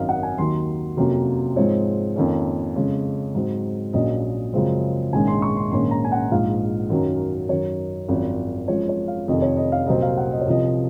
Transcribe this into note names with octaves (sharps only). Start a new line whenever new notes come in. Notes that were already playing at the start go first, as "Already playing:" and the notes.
Already playing: G#1 F#2 D#3 D#5 F5
F#5
G#5
D#2 D#3 F#3 C6
F2 C3 F#3 A#3 C#4
G#2 F3 G#3 C4 C#5
F2 D#3 A#3 C#4
F2 C#3 G#3 C#4
G#2 F#3 C4
A#1 A#2 F#3 C#4 D#5
F#2 C#3 F3 G#3 C4
A#1 G#2 D#3 G#3 C#4 G#5
C6
C#6
C6
A#1 G#2 D#3 A#3 C#4 C6
A#5
G#5
F#5
A#1 G#2 F3 F5
F#2 D#3 F#3 C#4
F#2 D#3 F#3 C#5
G#1 F#2 F3
F#2 F3 G#3 C#5
C#5
F5
F1 F2 D#3 D#5
C#5
D#5
F5
C2 A#2 F#3 C4 D#5
F5
F#5
D#5
C#5
C2 C3 F3 D#5